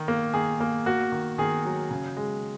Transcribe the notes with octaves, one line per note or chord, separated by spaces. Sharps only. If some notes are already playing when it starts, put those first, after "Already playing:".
Already playing: D#3
A#3
D#3 G#4
A#3
A#3 F#4
D#3
D#3 G#4
F#3
C#3
G#3